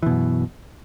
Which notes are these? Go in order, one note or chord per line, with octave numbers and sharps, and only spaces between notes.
F#2 B2 E3